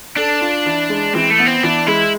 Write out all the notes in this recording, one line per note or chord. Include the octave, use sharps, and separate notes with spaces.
D4 A4
F4
E3
G#3
E3 C4
A3
B3
C4
E3 D4
G#3 E4